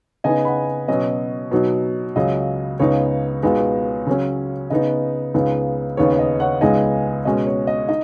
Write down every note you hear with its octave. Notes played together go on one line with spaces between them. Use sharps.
C#3 B3 D#4 D#5 G#5
F#5 B5
B2 F#3 C#4 D#5
B2 F#3 D#4
C#2 C#3 F#3 D#5
C#2 C#3 B3 D#4 C#5
C#2 B2 G#3 B3 D#4
C#3 F#3 C#4
C#3 B3 D#4 D#5
C#2 C#3 B3 D#4
D#2 C#3 B3 D#4 C#5
D#5
C#5 F#5
C#2 C#3 G#3 B3 D#4 D#5 G#5
B2 G#3 C#4 D#5
C#5
D#5
D#4 D#5